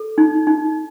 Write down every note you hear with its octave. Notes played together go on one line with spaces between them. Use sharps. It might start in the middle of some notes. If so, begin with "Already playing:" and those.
Already playing: A4
D#4
D#4